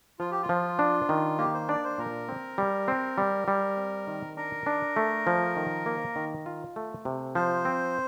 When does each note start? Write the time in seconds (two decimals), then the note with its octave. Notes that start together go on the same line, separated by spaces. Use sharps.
0.19 F3 F4
0.31 G4
0.42 F4
0.49 F3
0.79 D4
1.09 D#3
1.38 A#3 G4
1.54 C5
1.69 D4 D5
1.84 C5
1.98 A#2 A#4
2.29 C4
2.58 G3
2.88 C4
3.18 G3
3.48 G3
3.77 C4
4.07 D#3
4.37 D4 A#4
4.66 D4
4.96 A3
5.27 F3
5.56 D#3
5.86 A#3
6.16 D#3
6.46 F4
6.76 A3
7.05 C3
7.35 F3 C5
7.65 C4